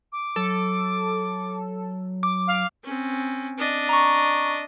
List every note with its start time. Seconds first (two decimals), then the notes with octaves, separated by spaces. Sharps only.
0.12 D6
0.36 F#3 A4
2.23 D6
2.47 F5
2.84 C4 C#4
3.58 D4 D#5
3.89 A#5 C#6